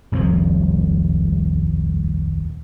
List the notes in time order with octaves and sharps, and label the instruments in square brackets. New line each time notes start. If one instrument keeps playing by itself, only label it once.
[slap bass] D#1 C2 F2 F3